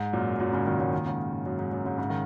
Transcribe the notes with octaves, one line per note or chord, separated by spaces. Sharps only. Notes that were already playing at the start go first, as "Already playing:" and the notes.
Already playing: G#2
F#2 A#2
F#2 A#2
G#2 C#3
A#2 D#3
G#2 C#3
A#2 D#3
G#2 C#3
G#2
F#2
G#2
F#2
G#2 C#3
G#2 C#3
D#3